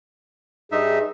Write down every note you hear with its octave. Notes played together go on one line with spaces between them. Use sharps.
G2 D#4 G#4 E5